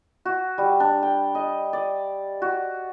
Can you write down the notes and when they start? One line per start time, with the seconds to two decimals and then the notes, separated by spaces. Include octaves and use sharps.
0.25 F#4
0.58 G3
0.80 D4
1.03 G5
1.35 D#5
1.73 D5
2.42 F#4